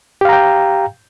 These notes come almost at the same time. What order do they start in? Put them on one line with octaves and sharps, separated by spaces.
G4 F5 A#5 G5